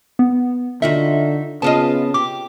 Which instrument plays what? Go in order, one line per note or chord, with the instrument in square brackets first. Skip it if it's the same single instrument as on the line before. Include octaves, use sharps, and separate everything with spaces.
[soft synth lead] B3
[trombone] D3 [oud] D#4 F4 F#4 [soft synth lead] E5
[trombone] C#3 [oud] B3 F4 D#5 [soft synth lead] A5
[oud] G4 [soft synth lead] D6